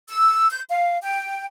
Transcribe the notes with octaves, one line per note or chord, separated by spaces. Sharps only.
E6
G6
F5
G5